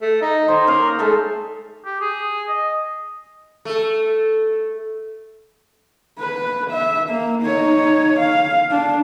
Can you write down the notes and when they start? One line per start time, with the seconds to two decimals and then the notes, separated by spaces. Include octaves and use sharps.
0.02 A3
0.21 D#4
0.48 D#3 C5
0.67 A#3 C#4 D#4 A#4
0.99 G#3 A3 A4 G#5
1.86 G4
2.01 G#4
2.48 D#5
3.65 A3 A4
6.20 B4
6.71 E5
7.10 A#3
7.43 D#4 C#5
8.19 F5
8.71 D4